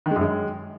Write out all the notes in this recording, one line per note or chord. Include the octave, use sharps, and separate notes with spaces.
D#3
G#3
F#2
G#3